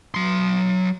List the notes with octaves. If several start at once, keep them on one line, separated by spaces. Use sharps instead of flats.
F#3 C6